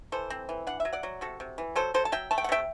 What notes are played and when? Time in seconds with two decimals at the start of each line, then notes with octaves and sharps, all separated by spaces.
0.12 E3 A4 C5
0.30 C4
0.49 E3
0.67 D4 F#5
0.80 E5
0.85 F#3
0.93 D5 F#5
1.03 F#3
1.21 C3 F#4 A4
1.40 C3
1.58 E3
1.76 F#3 A4 C5
1.94 F#3 A4 C5
2.05 A5
2.12 F#3 E5 G5
2.31 A3 A5
2.38 G5
2.44 F#5
2.49 C3 E5 G5